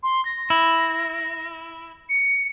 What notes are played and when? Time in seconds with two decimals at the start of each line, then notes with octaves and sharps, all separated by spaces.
0.03 C6
0.25 A#6
0.50 E4
2.09 C#7